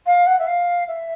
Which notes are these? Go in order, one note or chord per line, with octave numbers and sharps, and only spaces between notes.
F5
F#5
E5
F5
E5